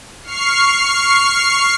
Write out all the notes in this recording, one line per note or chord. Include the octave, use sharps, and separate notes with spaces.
C#6 F6 C7